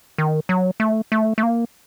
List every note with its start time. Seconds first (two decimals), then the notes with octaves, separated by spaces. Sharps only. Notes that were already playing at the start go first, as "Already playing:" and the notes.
0.18 D#3
0.49 F#3
0.80 A3
1.12 A3
1.38 A3
1.43 A#3